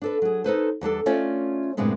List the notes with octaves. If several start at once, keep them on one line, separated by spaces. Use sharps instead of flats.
D4 A4 B4
F#3 G#4
D#4 A4 B4 C5
E2 G3 D4 A4
A3 C#4 F4 C#5 D5 E5
F#2 A2 C3 G#3 B3 D4